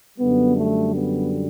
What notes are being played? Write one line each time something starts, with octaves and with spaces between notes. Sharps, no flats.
F#2 D3 G3 B3
A3
B3